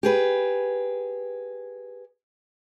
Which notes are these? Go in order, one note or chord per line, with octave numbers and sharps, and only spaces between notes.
G4 G#4 B4